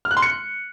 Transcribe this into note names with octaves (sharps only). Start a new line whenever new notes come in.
F6
F#6
C6
C#7